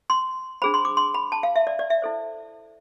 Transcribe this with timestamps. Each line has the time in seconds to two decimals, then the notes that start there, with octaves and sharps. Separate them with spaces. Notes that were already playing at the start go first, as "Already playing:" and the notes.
0.10 C6
0.62 D4 G#4 C5 B5
0.74 C6
0.85 D6
0.97 C6
1.14 B5
1.32 A5
1.43 F5
1.56 E5
1.67 D5
1.79 D5
1.90 E5
2.02 E4 A4 C5